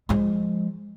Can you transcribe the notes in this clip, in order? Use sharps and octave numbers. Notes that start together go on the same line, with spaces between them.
F3 G#3